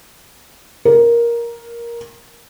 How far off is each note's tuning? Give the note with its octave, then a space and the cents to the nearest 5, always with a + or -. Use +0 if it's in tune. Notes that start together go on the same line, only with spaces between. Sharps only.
A#4 +10